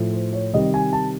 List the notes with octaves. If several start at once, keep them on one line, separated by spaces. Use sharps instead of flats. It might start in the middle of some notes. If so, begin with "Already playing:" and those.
Already playing: A2 F3
C5
C#5
C3 D#3 G3 D#5
G#5
A5